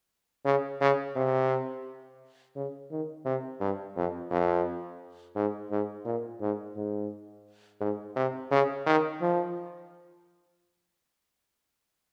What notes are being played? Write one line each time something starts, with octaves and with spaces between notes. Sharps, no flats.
C#3
C#3
C3
C#3
D#3
C3
G2
F2
F2
G#2
G#2
A#2
G#2
G#2
G#2
C3
C#3
D#3
F3